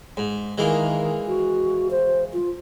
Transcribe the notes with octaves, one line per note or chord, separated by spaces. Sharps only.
G#2
D#3 E3 G#3 A#3
F#4
C5
F4